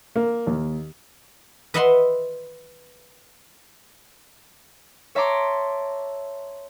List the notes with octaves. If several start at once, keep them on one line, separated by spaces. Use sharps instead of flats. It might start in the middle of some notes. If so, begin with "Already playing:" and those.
A#3
D#2
B4 D#5 E5 F#5 B5 C6
C#5 E5 A5 A#5 C6 D6